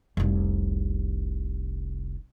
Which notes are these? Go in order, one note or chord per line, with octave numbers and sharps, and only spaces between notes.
F1 C2